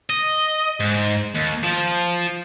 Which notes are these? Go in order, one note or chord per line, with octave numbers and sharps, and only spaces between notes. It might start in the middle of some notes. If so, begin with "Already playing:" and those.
D#5
G#2
D#2
F3